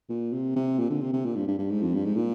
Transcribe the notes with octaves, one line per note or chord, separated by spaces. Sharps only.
A#2
C3
C3
A#2
D3
C3
C3
A#2
G2
G2
G2
G#2
F2
G2
G#2
A#2